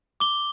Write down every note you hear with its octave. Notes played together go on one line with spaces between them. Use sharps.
D6 G7